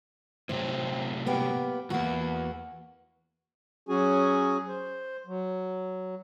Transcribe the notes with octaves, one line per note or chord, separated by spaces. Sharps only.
A2 C3 F#3 C4
A#3 B3 G4
E2 G#2 A#3 B3 F#4
F#3 C#4 F#4 G#4 G#5
C5
F#3